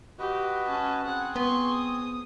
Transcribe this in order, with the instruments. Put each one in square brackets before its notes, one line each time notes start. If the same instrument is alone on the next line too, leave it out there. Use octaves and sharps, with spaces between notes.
[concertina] F#4 B4 D#5 [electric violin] G4
[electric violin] C#4 A5
[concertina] C4 G#4 [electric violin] F#5
[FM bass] B3 [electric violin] C6 C#6
[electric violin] D#6